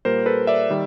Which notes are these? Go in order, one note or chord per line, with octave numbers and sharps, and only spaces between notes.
A#2 G3 A#3 A#4 C5
A4 B4
D5 E5
D#3 G3